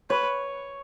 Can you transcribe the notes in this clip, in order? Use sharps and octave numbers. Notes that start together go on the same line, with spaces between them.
B4 C#5